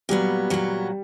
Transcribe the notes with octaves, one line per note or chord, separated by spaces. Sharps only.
A#2 F#3 G3 B3
A#2 F#3 B3